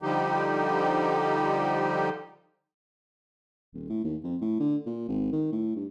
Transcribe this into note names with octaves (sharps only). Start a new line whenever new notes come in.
D3 F3 G3 D#4 G4
D#1
A2
D#2
F2
A2
D3
A#2
G#1
D#3
A2
G2